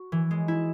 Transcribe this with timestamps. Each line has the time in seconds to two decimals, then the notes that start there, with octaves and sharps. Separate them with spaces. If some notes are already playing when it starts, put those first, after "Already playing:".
Already playing: F#4
0.12 E3
0.31 G#3
0.48 E4